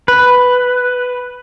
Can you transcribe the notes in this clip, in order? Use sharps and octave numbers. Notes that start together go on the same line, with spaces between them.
B4